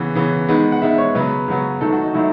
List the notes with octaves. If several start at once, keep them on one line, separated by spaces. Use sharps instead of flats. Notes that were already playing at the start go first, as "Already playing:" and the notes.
Already playing: C#3 E3 B3
C#3 E3 B3
D#3 G#3 B3
F#5
D#3 G#3 B3 E5
C#5
C#3 F#3 B3 B4
C#3 F#3 B3
D#3 F#3 A3 A4
F#4
D#4
D#3 F#3 A3 E4